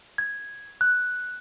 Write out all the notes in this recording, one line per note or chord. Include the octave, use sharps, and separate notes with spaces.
G#6
F#6